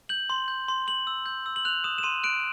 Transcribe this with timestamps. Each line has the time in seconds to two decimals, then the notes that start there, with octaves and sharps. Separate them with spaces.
0.09 G6 F#7
0.30 C6
0.48 G6
0.68 C6
0.87 C6 F#7
1.07 E6
1.26 G6
1.46 E6
1.56 F#7
1.65 F#6 F7
1.84 D#6 E7
1.98 E7
2.03 C6 D#7
2.24 F#6 D7